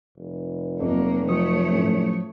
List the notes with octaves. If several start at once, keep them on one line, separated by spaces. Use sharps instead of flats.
F1
F2 F#3 A#3
F3 F#3 A3 C#5 D#6
A2 C#4